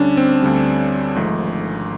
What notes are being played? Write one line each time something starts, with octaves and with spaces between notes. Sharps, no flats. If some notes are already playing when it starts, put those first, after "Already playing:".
Already playing: D2 D3 G3 C#4 D4
C4
D2 D3 G3
G#1 G#2 F3 A3